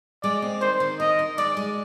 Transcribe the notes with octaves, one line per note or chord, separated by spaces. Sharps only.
G#3 D5
C4
D#3 C5
D#3
A#4 D#5
D#4
G#3 D5
G#3